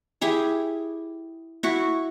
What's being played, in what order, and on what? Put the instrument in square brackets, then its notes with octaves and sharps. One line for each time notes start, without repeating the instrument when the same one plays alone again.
[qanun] E4 G4 G#4
E4 F#4 C#6